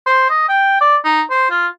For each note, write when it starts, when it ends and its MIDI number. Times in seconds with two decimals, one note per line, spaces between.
0.06 0.27 72
0.30 0.46 75
0.49 0.80 79
0.81 0.97 74
1.04 1.22 63
1.30 1.49 72
1.51 1.67 65